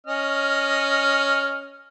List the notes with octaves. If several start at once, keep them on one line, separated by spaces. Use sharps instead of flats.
C#4 D#5 F6